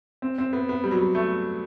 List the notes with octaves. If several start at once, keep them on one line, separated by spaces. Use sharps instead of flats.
C4
C4
B3
B3
G3
F#3
G3
A3